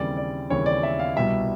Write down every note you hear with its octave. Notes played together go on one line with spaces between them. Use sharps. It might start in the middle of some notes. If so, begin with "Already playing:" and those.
Already playing: D#2 C#3 E3 G3 C4 D5
D5
D#2 C#3 E3 G3 C4 C#5
D5
E5
F5
C2 B2 G3 E5